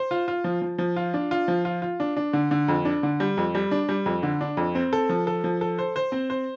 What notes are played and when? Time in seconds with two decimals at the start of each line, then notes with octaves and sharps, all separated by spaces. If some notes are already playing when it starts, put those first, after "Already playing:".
Already playing: C5
0.11 F4
0.28 F4
0.44 F3
0.62 F3
0.78 F3
0.96 F4
1.14 D4
1.31 F4
1.48 F3
1.65 F4
1.82 F4
2.00 D4
2.17 D4
2.33 D3
2.51 D3
2.68 F2
2.85 D4
3.03 D3
3.20 G3
3.37 F2
3.55 G3
3.71 D4
3.89 G3
4.06 F2
4.23 D3
4.41 D4
4.57 F2
4.75 C4
4.93 A4
5.09 F3
5.27 A4
5.44 F3
5.61 A4
5.78 C5
5.96 C5
6.12 C4
6.30 C5